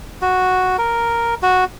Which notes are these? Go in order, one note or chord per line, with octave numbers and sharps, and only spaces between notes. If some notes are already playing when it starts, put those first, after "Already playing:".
F#4
A#4
F#4